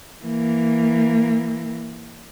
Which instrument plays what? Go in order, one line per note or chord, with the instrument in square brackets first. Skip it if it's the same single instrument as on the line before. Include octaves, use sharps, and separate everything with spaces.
[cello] E3 A#3